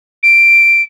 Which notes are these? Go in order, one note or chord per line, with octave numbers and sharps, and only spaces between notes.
D7